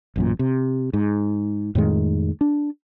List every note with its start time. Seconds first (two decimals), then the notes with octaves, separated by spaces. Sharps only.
0.16 A1 F#2 A#2
0.39 C3
0.93 G#2
1.75 F2 A2 D#3 G#3
2.41 D4